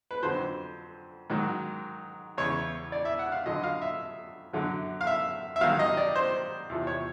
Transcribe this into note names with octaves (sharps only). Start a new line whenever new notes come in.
B4
F2 D3 F#3 C5
G#2 D#3 F#3
E2 C#3 E3 C#5
D5
E5
F#5
F5
F2 D3 F#3 D#5
F5
E5
F#2 D3 F#3
F5
E5
E5
G2 D#3 F#3 F5
D#5
D5
C5
E2 C3 F3
C#5